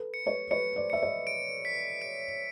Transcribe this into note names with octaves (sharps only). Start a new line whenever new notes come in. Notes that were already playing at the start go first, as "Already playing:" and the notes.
Already playing: A4 B4
C#7
B4 C#5
B4 C#5 C#7
C5 D5
E5 C#7
C#5 D#5
D7
B6
D7